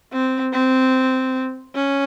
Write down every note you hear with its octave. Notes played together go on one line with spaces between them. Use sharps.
C4
C4
C#4